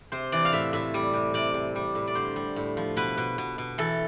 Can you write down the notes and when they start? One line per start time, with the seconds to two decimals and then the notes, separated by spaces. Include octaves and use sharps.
0.12 C3 C5
0.32 E3 D5
0.45 F5
0.52 A2 E5
0.73 A2 E5
0.94 G3
1.14 C3
1.34 C3 D5
1.54 C3
1.75 G3
1.95 A2
2.07 D5
2.15 D3 C5
2.36 G3
2.56 A2
2.77 F3
2.97 B2 B4
3.18 B2
3.38 B2
3.58 B2
3.78 E3 A4